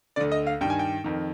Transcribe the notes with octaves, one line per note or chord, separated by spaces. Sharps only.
D2 D3 D5
D#5
F5
G2 D#3 G5
G#5
G5
F2 D#3